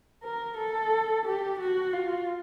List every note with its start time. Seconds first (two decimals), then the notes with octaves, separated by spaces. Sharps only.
0.24 A#4
0.57 A4
1.25 G4
1.60 F#4
1.93 F4